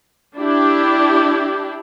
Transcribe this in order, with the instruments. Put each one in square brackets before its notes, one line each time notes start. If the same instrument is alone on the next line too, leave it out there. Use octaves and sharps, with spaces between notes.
[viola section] D4 E4 G4